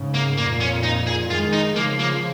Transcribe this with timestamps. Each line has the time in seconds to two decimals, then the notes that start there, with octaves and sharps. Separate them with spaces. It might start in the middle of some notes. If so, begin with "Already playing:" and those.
Already playing: G#2 C#3
0.14 A#3
0.37 F2 A#2 A#3
0.60 C#4
0.83 D#4
1.07 G#4
1.30 D#3 G#3 F4
1.53 D#4
1.76 C#3 F3 A#3
1.99 A#3